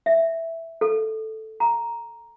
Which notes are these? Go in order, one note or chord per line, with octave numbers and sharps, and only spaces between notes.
E5
A4
A#5